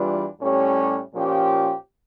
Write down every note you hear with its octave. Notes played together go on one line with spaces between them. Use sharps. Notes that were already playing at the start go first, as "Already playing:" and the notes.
Already playing: E2 E3 G3 D4 F4
A2 G3 C#4 G4 C#5
A#2 F3 C#4 G4